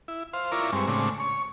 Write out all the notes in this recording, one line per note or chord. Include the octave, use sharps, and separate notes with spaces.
E4
C5 F5
E4 F4 A#4 C#5 D5
G2 G#3 C4 C#6
A2 C#3 G#3 C4 D4
C#5 C#6